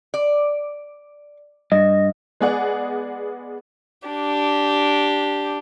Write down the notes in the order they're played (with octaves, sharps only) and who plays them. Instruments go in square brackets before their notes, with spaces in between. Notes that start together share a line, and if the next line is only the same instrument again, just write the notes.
[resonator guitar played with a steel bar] D5
[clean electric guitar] G2 [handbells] D#5
[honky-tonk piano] G#3 B3 G#4 D5 F#5
[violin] D4 G4